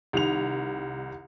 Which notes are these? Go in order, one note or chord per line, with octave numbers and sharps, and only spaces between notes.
C2 D#3 F7